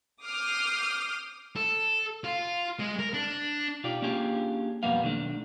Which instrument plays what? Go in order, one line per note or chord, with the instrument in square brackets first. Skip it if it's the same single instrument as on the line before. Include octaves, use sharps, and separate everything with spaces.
[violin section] D6 D#6 F6 G6 C7
[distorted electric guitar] A4
F4
G#3
A#4
D4
[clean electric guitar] B2 D#4 F4 G4 D5
A#3 C#4 D4 F4 G4 G#4
B1 F2 G3 A#3 B3 F5
B1 D#3 A3 D4